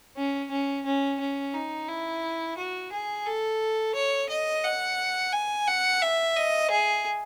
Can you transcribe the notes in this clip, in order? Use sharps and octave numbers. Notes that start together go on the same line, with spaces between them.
C#4
C#4
C#4
C#4
D#4
E4
F#4
G#4
A4
C#5
D#5
F#5
G#5
F#5
E5
D#5
G#4